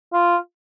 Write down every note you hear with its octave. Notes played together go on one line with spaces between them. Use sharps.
F4